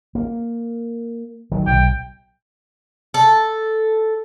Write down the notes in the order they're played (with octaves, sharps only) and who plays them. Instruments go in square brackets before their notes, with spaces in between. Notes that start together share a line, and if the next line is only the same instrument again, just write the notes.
[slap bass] A#3
D#3 F#3
[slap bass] B1 [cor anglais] G5
[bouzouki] A4